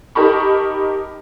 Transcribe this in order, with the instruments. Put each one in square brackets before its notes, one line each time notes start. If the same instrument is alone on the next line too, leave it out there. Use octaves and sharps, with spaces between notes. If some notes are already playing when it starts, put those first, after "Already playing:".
[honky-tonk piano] D#4 G4 A#4 A5 B5 C#6